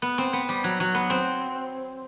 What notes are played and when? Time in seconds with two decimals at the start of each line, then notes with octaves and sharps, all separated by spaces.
0.02 B3
0.18 C4
0.33 B3
0.49 G3
0.64 F#3
0.80 F#3
0.95 B3
1.10 C4